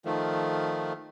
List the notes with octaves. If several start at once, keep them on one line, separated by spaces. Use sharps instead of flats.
D#3 F3 A3